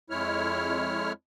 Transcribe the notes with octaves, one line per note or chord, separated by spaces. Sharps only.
F2 G#3 E4 C#5 F6